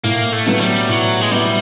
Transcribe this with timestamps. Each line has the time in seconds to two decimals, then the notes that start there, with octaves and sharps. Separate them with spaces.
0.04 A2 A#3
0.32 A3
0.46 F#3 B3 E4
0.60 G3
0.89 A2 F#3
1.21 G#3
1.32 F#3 G3 B3 E4